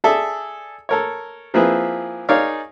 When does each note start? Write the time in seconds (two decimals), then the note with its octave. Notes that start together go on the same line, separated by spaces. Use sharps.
0.04 G#4 A4 D5 E5
0.89 A4 A#4 C#5
1.54 F3 A#3 C4 E4 G#4 B4
2.29 D#4 G#4 A#4 C#5 D5 F5